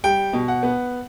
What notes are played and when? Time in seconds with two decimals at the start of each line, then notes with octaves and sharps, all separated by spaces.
0.04 G3 G5
0.33 B2
0.48 F#5
0.63 B3